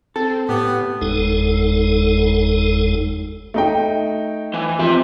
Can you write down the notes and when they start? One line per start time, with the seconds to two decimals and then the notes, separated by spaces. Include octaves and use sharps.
0.16 C4 A4
0.49 A2 B3 G4
1.01 F#1 E2 G#3 D#4 A4
3.54 A3 D#4 G5
4.54 E3
4.79 F3 C4 E5